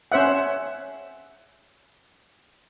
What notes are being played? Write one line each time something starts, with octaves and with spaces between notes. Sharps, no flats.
C#4 C5 E5 F#5